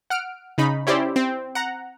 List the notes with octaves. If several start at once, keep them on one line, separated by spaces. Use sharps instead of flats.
F#5 F6 D7
C#3 D#4 B5
C#4 E4 G4 C5 D5
C4
F#5 A#5